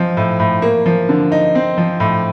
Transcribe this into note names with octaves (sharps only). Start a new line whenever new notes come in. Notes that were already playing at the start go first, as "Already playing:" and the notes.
Already playing: F3 C4 D#4
A2
A2
A#3
F3
D3
D#4
C4
F3
A2